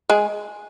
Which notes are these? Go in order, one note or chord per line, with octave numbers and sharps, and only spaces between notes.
G#3 G#4